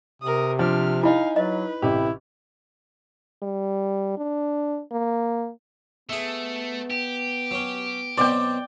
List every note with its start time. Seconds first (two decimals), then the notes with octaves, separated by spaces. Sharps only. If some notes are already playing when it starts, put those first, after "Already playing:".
0.22 C3 A#4 D#6
0.59 F3 D4 F6
1.03 D#4 E4 F5 G#5 B5
1.36 F#3 B4 D#5
1.82 A1 C3 E4 G4
3.43 G3
4.17 D4
4.92 A#3
6.09 A3 B3 G#4 E5
6.91 G4
7.51 F#3 C#4
8.17 B2 F#3 C4 D5 G5